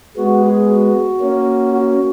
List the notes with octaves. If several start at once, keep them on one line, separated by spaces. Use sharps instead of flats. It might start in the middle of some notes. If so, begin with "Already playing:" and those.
G#3 B3 F#4
G#4
F#4
A#3 C#4
F#4